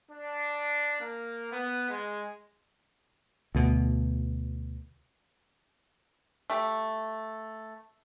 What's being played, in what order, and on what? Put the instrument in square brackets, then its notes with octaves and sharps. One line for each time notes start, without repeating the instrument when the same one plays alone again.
[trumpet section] D4
A#3
B3
G#3
[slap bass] D2 B2
[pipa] A3 G4